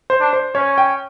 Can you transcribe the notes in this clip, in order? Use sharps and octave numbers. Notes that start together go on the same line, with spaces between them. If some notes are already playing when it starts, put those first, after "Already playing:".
C5
D4
C5
C#4 C#5
G5